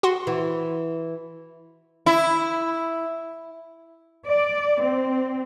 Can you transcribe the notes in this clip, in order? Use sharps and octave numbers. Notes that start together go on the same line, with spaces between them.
F#4 F#5 C6
E3
E4
D5
C4